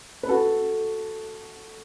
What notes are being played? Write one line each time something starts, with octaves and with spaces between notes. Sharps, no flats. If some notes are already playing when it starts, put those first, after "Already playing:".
B4
F#4 A4